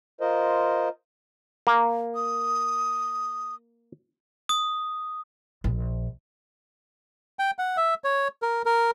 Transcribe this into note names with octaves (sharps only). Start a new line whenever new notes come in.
F4 A#4 C5 D#5
A#3
D#6
D#6
A#1
G5
F#5
E5
C#5
A#4
A#4